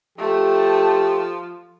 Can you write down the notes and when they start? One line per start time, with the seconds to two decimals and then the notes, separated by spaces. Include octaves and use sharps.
0.18 F3 A3 G4 A5